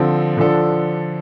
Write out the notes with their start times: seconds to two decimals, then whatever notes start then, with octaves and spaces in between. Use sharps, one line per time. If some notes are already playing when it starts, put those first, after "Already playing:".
Already playing: D3 F3 C4 A4
0.37 D3 F3 D4 A4